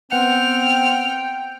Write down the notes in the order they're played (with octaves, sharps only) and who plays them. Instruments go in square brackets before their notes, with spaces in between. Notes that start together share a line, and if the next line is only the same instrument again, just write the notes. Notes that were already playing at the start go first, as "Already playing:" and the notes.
[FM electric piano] B3 F#5 C#7 [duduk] C4 [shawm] G5 [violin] F6